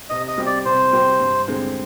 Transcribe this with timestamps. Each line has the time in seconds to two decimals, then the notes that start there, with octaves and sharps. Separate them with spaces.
0.10 C3 D#5
0.28 D#5
0.38 G3 C4 G4
0.46 D5
0.65 C3 C5
0.93 G3 C4 G4
1.20 G2
1.48 D3 G#3 C4